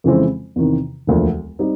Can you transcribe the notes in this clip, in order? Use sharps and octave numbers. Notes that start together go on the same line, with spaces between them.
F2 C#3 E3 G#3 C4
E2 C3 D#3
E1 D2 D3 F3 A#3
G3 C4 D#4